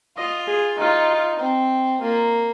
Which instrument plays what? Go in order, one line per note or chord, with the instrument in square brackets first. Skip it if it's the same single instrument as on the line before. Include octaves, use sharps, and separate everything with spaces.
[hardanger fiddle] F4 [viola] D#5
[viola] G#4
[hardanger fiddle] D#4 [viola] F4
[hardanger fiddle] C4
[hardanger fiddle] A#3 [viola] F4